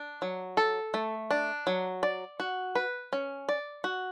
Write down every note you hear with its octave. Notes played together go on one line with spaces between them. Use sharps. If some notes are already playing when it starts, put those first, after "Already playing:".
Already playing: D4
F#3
A4
A3
D4
F#3
D5
F#4
B4
C#4
D5
F#4